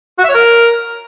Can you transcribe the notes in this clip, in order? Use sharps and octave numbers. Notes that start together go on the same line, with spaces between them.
F#4
E5
C#5
A#4